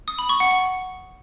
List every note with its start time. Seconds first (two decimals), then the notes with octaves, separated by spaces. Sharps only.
0.08 D#6
0.19 B5
0.29 C#6
0.40 F#5
0.51 F#5